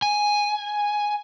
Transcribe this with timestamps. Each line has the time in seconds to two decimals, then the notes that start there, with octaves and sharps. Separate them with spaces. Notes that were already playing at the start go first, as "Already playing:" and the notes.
0.02 G#5